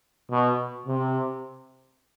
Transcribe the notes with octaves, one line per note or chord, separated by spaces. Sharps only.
B2
C3